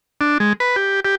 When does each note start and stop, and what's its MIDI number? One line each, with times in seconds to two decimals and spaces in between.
0.21 0.38 62
0.40 0.53 56
0.60 0.76 71
0.76 1.00 67
1.05 1.15 67